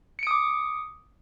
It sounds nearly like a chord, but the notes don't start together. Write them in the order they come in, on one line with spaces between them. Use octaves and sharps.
C#7 D7 D#6 D6